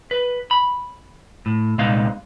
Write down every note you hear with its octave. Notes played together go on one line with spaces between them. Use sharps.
B4
B5
A2
C2 A#2 G#3 B3 D#4 F5